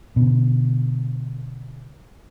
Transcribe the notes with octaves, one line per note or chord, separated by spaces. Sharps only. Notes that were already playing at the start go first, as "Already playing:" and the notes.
B2 D3